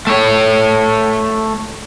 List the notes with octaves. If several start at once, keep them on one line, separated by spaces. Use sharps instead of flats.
A3 C#5